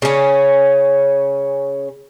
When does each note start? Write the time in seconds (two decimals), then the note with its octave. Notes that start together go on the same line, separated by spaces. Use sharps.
0.02 C#3 C#4